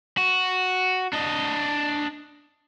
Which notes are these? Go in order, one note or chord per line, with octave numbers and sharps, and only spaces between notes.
F#4
D4 D#5